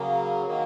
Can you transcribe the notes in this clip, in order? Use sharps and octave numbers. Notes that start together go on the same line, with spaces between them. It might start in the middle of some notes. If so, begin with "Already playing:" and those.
Already playing: C#3 F#3 A#3
D#3 F#3 A#3